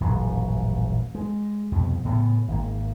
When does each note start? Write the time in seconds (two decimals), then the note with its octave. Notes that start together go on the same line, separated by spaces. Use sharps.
0.01 D#1 A1 F#2 F#3
1.15 G#3
1.72 C2 F2 B2
2.05 A2 C#3 B3
2.48 G#1 A#3